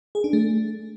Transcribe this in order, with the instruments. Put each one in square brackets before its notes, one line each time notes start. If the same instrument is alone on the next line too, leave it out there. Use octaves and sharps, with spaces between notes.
[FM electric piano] G#4
D4
A3